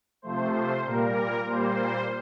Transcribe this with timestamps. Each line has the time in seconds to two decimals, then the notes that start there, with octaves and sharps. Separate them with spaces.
0.22 C3 F3 A3 C5
0.53 C5
0.85 A#2 G3 A#3 A#4
1.46 A#2 G3 A#3 C5